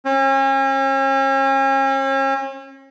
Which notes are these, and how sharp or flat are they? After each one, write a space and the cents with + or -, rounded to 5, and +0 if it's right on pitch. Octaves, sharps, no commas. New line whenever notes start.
C#4 -40